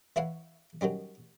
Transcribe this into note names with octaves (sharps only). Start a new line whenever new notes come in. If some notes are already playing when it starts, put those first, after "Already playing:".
E3 E4 C#5 F5 F#5
D#3 F#3 G3 C#4